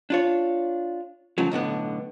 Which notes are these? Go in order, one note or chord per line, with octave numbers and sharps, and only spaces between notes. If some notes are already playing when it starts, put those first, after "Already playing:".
D4 F4 C#5
A2 C#3 F3 F#3
B1 A2 D3 B3